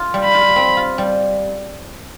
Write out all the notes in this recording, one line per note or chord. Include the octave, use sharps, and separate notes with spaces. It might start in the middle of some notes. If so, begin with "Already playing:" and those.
Already playing: F4
G3
B5
F4
C4
F4
G3